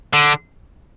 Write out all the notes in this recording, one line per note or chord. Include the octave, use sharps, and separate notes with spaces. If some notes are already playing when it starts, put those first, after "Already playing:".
D3